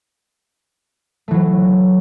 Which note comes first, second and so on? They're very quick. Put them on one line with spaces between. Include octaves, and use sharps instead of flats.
A3 E3 F#3